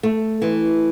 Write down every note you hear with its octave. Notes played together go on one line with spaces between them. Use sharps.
A3
E3